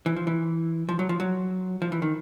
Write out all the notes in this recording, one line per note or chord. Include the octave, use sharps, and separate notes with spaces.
E3
F3
E3
F3
F#3
F3
F#3
F3
E3
D#3